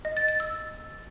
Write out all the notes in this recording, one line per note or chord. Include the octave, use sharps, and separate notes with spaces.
D#5
A6
A6
E6